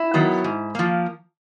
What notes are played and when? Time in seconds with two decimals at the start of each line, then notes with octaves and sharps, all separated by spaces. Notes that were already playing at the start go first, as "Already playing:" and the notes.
Already playing: E4
0.14 D#3 F#3 B3
0.44 G#2
0.75 F3 A#3